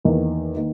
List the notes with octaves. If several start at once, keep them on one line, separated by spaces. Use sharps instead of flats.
E2 D#3 A#3
D#3 A#3